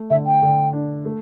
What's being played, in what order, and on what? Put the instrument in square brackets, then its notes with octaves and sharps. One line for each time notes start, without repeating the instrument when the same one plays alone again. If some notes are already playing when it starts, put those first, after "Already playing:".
Already playing: [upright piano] A3
[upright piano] D3 [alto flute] E5
[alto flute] G5
[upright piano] D3
D4
A3